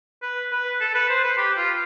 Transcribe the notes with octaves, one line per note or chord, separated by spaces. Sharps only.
B4
B4
A4
B4
C5
B4
G4
F4